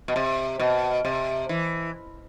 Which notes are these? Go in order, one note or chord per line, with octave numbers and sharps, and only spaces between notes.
B2
C3
B2
C3
E3